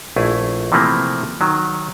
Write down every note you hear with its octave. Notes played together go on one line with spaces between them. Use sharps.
A#1 A3 E4 G#4
C3 E3 F3 A3 A#3 C4
D#3 F#3